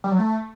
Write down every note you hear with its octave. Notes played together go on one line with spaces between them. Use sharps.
G3
F#3
A3